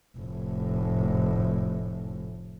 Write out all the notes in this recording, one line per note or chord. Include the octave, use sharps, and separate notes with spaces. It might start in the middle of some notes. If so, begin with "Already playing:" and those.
F1 A2